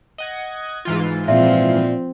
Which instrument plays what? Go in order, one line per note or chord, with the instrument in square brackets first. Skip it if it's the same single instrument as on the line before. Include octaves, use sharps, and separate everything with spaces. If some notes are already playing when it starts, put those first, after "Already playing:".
[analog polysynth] D#5 F#5 G#6
G#2 E3 F4
[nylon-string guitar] A#2 [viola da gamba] F3 C4 [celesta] E5